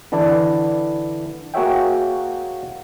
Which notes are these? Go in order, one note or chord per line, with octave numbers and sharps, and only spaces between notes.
D3 E3 D4 E4 D5
A#3 F#4 G#4 C#5 E5 G5